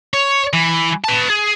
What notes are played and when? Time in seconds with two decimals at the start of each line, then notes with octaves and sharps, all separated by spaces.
0.14 C#5
0.53 E3
1.04 B4 A5
1.30 G#4